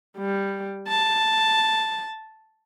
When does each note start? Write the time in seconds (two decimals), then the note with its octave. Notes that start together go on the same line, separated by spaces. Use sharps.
0.18 G3
0.88 A5